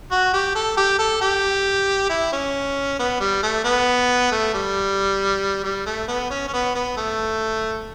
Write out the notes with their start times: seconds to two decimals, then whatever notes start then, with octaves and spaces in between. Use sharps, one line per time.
0.11 F#4
0.33 G4
0.55 A4
0.77 G4
0.99 A4
1.21 G4
2.10 E4
2.32 C#4
2.99 B3
3.20 G3
3.43 A3
3.64 B3
4.32 A3
4.54 G3
5.64 G3
5.86 A3
6.08 B3
6.30 C#4
6.48 C#4
6.53 B3
6.75 B3
6.97 A3